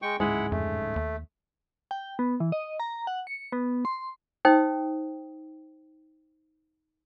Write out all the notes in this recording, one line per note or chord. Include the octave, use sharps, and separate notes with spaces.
G#3 G5 C#6
D1 G#2 C#3 G#3 E4 F#5
F2 A3
D#2
G5
B3
E3
D#5
A#5
F#5
C#7
B3
C6
D#4 C5 G5 D#6